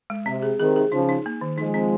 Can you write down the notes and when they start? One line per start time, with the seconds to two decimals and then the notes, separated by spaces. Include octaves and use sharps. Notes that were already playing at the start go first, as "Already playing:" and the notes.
0.10 G#3
0.26 C3 C4
0.42 G#4
0.59 C3 D#3 G#4
0.76 G#4
0.92 C#3 F3 D#4
1.09 D#4
1.26 A#3
1.41 D#3
1.58 F3 G#3 D#4
1.74 C4